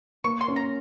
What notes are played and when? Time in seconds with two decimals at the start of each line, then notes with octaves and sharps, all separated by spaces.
0.24 A#3 C#6
0.41 C6
0.48 C#4
0.56 A#5